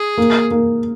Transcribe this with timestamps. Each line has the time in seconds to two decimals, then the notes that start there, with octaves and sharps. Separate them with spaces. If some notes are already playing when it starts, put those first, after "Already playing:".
Already playing: G#4
0.18 A#3
0.51 A#3